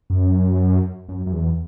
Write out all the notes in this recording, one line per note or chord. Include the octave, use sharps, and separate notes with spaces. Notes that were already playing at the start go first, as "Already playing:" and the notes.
F#2
F#2
F#2
E2